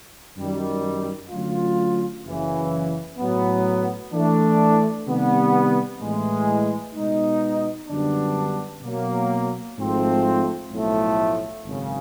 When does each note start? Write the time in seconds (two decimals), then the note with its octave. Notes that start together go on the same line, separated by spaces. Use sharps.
0.37 F#2 D#3 G3
1.30 D3 F#3 A3 C#4 F4
2.25 F#1 F#2 C#3 E3
3.18 A2 F#3 B3
4.13 E3 A3 D4
5.07 C3 D#3 G3 B3
6.01 A2 E3 G#3
6.95 B2 G#3 B3 D#4
7.89 F#2 D3 G3 B3 D4
8.82 B2 F#3 A#3
9.77 G#1 G#2 F3 A3 C4
10.71 B1 A2 F3 A3
11.65 G#1 F#2 C#3